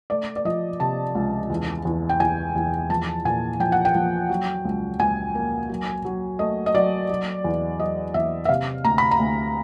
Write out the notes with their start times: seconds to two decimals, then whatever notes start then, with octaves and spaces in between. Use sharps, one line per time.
0.10 A3 D5
0.36 D5
0.45 F3 D#5
0.80 C3 A5
1.15 C#2
1.50 E2
1.85 E2
2.09 G5
2.20 E2 G#5
2.56 E2
2.90 F3 A5
3.25 A#2 G#5
3.60 F3 G5
3.72 F#5
3.85 G5
3.95 F3
4.30 F#3
4.65 C#2
4.99 C#2 G#5
5.35 A#3
5.69 F#3
6.05 F#3
6.39 A3 D#5
6.66 D#5
6.74 F#3 D5
7.10 F#3
7.44 E2
7.79 F#3 D#5
8.14 E2 E5
8.45 E5
8.49 C3 F5
8.84 D2 A#5
8.98 B5
9.11 A#5
9.20 D2